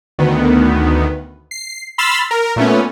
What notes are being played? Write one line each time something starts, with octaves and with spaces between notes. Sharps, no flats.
D2 D#3 B3
C7
B5 C6 E6 F6 A6 B6
A#4
A#2 A3 B3 C#4